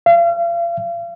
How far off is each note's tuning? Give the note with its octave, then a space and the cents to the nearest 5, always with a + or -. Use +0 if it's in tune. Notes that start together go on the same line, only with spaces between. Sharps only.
F5 -40